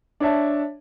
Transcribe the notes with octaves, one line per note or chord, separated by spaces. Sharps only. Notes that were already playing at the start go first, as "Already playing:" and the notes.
D4 C#5 E5 A5